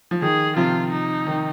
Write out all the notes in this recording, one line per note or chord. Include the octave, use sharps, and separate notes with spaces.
F3
D#3 G#4
C3 F3 F4
D#4
D#3